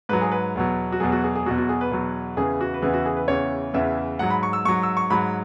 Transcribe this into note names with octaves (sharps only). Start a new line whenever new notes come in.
G#2 F#3 B4
G#4
B4
E2 B2 F#3
F#4
E2 B2 F#3 G#4
F#4
G#4
G#4
E2 B2 F#3 F#4
F#4
G#4
B4
E2 B2 F#3
E2 C#3 E3 G#4
F#4
B4
E2 C#3 E3 G#4
F#4
G#4
B4
E2 C#3 E3 C#5
E2 C#3 E3 E5
G#2 F#3 F#5
B5
C#6
E6
G#2 F#3 C#6
E6
C#6
G#2 F#3 B5